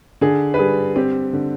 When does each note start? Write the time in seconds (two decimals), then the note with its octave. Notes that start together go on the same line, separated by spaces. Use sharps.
0.21 D3 G#4
0.54 B4
0.59 G3 G#4
0.96 C4 G4
1.33 D3